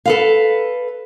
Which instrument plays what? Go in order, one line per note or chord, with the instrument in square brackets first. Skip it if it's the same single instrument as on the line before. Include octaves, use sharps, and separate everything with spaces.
[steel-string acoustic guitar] A4 B4 F5